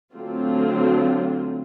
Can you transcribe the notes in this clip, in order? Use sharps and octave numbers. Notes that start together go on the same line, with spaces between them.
D3 F#3 A3 C4 F4